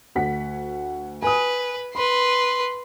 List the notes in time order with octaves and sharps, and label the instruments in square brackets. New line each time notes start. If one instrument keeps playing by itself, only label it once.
[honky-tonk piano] D2 F#5 B6
[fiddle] B4 [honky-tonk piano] G#5 D#6
[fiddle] B4 C6 [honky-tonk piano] B5